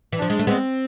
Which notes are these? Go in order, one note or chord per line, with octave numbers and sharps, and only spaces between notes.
E3
F3 D4
G#3
A3
G#3 B3 C4